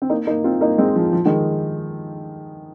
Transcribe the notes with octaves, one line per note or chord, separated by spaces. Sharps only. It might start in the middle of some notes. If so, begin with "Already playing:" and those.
C4
A#3 D#4
A#3 D#4
C4 F4
A#3 D#4
G#3 C4
F3
F3
D#3 G#3